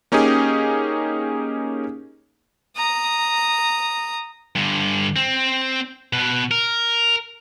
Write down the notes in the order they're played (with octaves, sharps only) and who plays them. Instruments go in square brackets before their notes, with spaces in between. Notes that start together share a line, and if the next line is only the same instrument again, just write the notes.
[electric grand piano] A#3 C#4 D#4 G4 G#4
[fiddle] A#5 D#6
[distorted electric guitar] G2 D3
C4
B2 B4
A#4